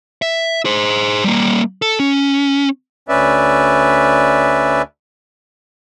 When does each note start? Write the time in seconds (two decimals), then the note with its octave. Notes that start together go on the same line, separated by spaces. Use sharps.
0.22 E5
0.65 G#4 C5
1.24 G3 A#3
1.82 A4
2.00 C#4
3.09 D2 C#4 B4 D5 E5